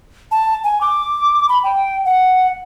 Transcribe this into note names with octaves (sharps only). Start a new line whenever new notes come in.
A5
G#5
D6
B5
G5
F#5